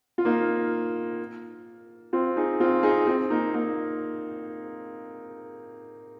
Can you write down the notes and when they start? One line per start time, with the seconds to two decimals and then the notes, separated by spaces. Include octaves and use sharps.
0.18 F4
0.25 A#3 D#4
2.13 C4 F4
2.37 D#4 G#4
2.60 C4 F4
2.83 D#4 G#4
3.07 C4 F4
3.30 A#3 D#4
3.54 A#3 D#4